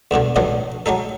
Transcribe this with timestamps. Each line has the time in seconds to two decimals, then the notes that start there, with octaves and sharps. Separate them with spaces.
0.11 E2 G2 B2 D3
0.36 G2 A#2 D3 D#3 F3 F#3
0.86 F#3 G#3 D#4 A4